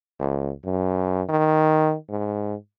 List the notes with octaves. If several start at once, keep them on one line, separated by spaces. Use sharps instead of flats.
C#2
F#2
D#3
G#2